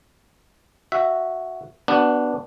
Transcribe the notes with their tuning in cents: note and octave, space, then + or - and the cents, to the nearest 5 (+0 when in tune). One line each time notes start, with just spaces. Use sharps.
F#4 +0 E5 +0
B3 +0 D4 +0 F#4 +35